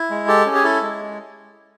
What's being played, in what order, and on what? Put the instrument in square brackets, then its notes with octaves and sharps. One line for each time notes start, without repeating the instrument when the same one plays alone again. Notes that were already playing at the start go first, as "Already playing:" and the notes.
Already playing: [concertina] E4
G#3
G4 A4
C#4
G#4
E4 A4
G#3